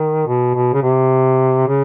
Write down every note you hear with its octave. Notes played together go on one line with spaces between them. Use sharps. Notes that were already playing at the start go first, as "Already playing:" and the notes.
Already playing: D#3
B2
B2
C#3
C3
C#3